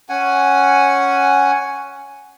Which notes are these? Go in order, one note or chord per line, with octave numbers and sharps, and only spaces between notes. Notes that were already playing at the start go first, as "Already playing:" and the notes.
C#4 F#5 G#5